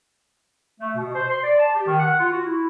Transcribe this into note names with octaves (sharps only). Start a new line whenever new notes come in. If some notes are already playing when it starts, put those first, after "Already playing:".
A3
B2
C5
C6
D5
A5
G4
D#3
F#5
F4
F#4
E4